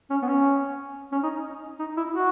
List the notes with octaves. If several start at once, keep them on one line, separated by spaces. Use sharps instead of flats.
C#4
B3
C#4
C#4
D#4
D#4
E4
F#4